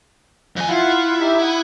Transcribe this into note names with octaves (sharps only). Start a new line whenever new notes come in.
F2 G#5
E4 F4 F5 F#5
D#4 G4 E5
F#5 D#6